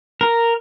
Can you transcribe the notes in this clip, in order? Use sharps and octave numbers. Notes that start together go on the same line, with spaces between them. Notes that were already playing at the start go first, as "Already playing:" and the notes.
A#4